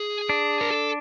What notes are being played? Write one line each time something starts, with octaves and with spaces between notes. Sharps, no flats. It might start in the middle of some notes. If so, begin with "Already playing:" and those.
Already playing: G#4
D4
A#4
A4